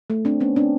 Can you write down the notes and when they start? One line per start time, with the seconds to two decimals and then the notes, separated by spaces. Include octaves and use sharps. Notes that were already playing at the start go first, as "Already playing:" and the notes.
0.10 A3
0.25 C4 D4
0.40 B3 C#4
0.56 C4 D4